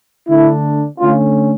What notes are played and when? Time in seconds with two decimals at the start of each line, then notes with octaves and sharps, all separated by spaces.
0.28 D3 A3 D4 E4
0.99 D3 A3 C#4 F4